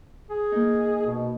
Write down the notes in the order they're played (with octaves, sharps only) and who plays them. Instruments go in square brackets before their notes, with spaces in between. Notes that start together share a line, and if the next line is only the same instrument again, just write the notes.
[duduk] G#4
[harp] A#3 D#4
[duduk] B2